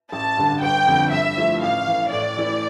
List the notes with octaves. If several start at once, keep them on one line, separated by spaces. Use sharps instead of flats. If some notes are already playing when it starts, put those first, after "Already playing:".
A1 A5
G2 D3
G1 G5
F2 D3
G2 E5
F3 A3 E4
A1 F5
A2 E3
A2 D5
E3 A3 E4